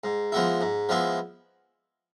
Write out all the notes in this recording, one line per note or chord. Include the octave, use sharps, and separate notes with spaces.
G#2
F3 G#3 B3 E4
G#2
F3 G#3 B3 E4